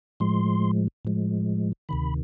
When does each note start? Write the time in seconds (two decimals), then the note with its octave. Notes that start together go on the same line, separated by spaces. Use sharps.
0.20 A2 F3 G#3 C6
1.05 A2 F3 G#3
1.89 D2 C3 D#3 B5